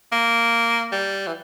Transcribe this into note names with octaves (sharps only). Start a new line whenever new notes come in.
A#3
G3
E3